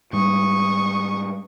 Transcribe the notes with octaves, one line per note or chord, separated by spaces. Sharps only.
G#2 G3 C#6 D#6